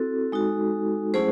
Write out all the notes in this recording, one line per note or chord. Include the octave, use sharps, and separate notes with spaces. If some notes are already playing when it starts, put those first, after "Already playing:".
Already playing: C4 E4 F#4 A4
G#3 D#4 F#4
F#3 A3 C#4 E4 G#4 C5